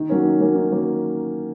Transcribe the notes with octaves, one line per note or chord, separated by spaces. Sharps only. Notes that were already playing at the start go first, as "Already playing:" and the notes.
Already playing: D#3
F#3 A#3 C#4
D#3
F#3 A#3 C#4
D#3
F#3 A#3 C#4